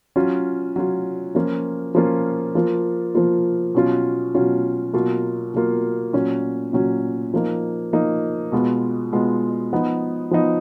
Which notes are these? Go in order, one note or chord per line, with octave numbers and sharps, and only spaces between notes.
F#3 C#4 F4
F#3 C#4 F4
F3 A#3 C#4 F4
F3 A#3 C#4 F4
F3 A#3 F4
F3 A#3 F4
B2 F#3 C#4 F4
B2 F#3 C#4 F4
B2 F#3 A#3 F4
B2 F#3 A#3 F4
A#2 F#3 C#4
A#2 F#3 C#4
F3 A#3 D#4
F3 A#3 D#4
B2 G#3 B3 F4
B2 G#3 B3 F4
F3 B3 D#4
F3 B3 D#4